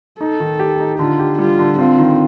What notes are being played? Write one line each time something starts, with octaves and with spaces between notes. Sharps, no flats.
D#4 A4
D#3
G4
D#4
D3 F4
G4
G3 F4
D3
C4 F4
D#3